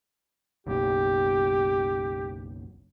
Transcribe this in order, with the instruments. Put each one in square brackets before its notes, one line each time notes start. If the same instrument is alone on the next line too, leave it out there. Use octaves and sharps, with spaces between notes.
[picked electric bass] F#1 B1 [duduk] G4